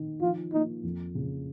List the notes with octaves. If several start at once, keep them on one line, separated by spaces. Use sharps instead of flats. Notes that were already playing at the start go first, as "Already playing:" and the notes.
Already playing: D#3
F3 F4
A#3 D#4
F2
C#3